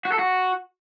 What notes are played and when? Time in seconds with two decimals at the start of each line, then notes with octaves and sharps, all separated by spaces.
0.05 F#4
0.12 A4
0.19 F#4